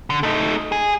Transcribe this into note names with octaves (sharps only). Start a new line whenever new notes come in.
D3
A3 D#4
G#4